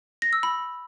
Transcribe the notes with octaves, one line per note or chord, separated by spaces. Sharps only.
A#6
E6
B5